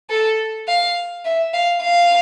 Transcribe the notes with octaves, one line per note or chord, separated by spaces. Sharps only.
A4
F5
E5
F5
F5